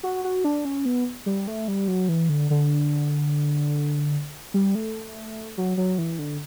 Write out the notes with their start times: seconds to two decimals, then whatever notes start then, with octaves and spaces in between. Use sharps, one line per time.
0.03 F#4
0.24 F#4
0.44 D4
0.65 C#4
0.85 B3
1.26 G3
1.47 A3
1.68 G3
1.88 F#3
2.09 E3
2.29 D3
2.50 D3
4.54 G3
4.75 A3
5.58 F#3
5.77 F#3
5.98 E3
6.19 D3